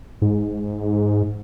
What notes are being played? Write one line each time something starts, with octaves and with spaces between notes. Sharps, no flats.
G#2